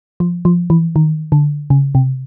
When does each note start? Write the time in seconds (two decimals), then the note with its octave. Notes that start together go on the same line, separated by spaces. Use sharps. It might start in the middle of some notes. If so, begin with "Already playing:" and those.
0.20 F3
0.45 F3
0.70 E3
0.96 D#3
1.32 D3
1.70 C#3
1.95 C3